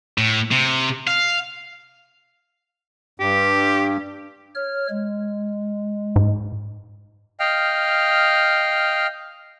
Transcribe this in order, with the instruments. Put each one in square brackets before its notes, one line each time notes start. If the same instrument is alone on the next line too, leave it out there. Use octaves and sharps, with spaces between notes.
[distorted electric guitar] A2
C3
F5
[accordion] G2 [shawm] G4
[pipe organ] C#5 F6
G#3
[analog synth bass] G#2
[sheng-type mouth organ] D#5 F5 G5 F6